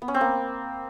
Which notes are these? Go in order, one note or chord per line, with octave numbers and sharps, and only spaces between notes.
B3
C#4
C4
A#3